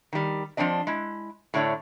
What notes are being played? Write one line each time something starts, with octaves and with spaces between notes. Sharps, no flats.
D#3 G3
F3 G3 C4 D4 D#5
G#3 E4
A2 D3 A3 C#5 D5